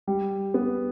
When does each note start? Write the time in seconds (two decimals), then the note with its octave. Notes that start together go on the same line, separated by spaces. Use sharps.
0.07 G3
0.54 B3